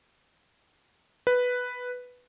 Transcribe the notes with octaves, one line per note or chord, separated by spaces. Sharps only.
B4